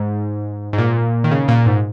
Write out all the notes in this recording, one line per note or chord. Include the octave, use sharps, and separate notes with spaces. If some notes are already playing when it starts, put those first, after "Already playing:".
Already playing: G#2
G#2
A#2
D#3
C#3
A#2
G#2